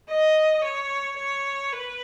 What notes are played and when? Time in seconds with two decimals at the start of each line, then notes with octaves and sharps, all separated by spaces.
0.10 D#5
0.64 C#5
1.19 C#5
1.73 B4